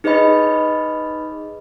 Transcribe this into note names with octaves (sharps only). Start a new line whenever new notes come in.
D#4 G#4 B4 C#5 D#5 B5